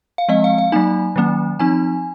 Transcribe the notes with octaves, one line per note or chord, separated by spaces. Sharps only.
F5
F3 G#3 C4 D#5
F5
F5
F#3 A#3 D#4 G#5
D#3 F#3 A#3 C#4
F3 C4 D#4 G#5